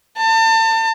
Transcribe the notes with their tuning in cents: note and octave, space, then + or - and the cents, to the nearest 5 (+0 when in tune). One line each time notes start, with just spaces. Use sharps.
A5 +35